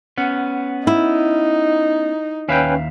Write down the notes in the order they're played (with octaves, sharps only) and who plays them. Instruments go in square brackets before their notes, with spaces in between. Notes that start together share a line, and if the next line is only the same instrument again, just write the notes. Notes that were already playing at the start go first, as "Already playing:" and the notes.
[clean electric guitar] B3 C#4 [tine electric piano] F#5
[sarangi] D#4 [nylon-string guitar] E4
[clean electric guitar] D#2 E5 F5 [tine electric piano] C#4 B4 G5